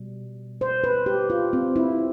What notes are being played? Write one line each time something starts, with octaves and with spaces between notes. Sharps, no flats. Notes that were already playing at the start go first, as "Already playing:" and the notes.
Already playing: B2 G3
C5
B4
G4
F4
C4
E4